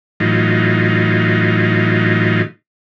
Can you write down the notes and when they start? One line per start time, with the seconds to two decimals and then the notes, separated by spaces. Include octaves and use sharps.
0.20 A2 E3 F#3 D#4 F4